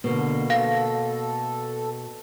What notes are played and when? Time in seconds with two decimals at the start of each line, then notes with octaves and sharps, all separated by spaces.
0.04 B2 D3 A#3
0.50 A4 F5 A#6